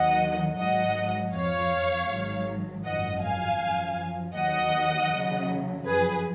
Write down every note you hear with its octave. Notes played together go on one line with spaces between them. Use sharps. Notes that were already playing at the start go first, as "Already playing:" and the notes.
Already playing: D#2 D#3 F#3 D#5 F#5
G#1 G#2 F#3 D#5 F#5
F2 F3 C#5 F5
G#1 G#2 D#3 F#3
G#1 F#2 F3 D#5 F#5
F5 G#5
F#2 F3
D#2 D#3 F#3 D#5 F#5
D#2 C#3 F#3
F#2 F3 G#4 B4